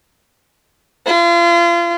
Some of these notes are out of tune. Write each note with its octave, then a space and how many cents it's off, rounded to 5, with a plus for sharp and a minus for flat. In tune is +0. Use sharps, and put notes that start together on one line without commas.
F4 -35